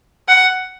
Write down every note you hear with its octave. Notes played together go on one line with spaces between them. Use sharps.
F#5